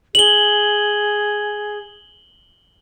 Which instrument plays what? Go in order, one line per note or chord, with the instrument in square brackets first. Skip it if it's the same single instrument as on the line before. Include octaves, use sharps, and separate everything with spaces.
[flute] G#4 [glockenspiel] F#7 G7